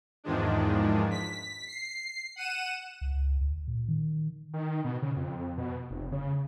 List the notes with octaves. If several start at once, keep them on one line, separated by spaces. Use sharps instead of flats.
E2 G#2 D#3 F3 G#3 D4
B6
C7
F#5 D#7 E7
C#2
D2
A#2
D#3
D#3
B2
C#3
F2
B2
F1
C#3